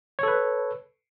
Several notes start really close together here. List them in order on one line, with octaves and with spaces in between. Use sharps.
C#5 A4 B4